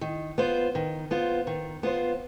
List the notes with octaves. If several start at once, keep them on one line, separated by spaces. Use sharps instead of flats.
D#3
B3 F4 C5
D#3
B3 F4 C5
D#3
B3 F4 C5